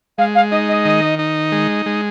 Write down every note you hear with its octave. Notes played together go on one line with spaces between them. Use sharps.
G#3 F5
F5
D#4 D#5
D#5
D#3
D#4
G#3
G#3